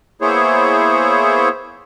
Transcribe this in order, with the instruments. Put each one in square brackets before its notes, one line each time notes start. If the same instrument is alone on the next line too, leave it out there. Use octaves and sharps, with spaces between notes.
[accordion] A#3 B3 E4 G#4 C5 C#5